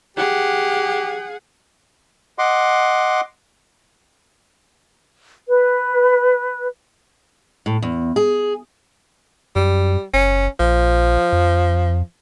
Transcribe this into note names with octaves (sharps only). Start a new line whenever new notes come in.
G4 G#4 F#5
D#5 F#5 C6 D6
B4
A2
E2
G#4
F#2 G3
F#1 C#4
A#1 F3
F2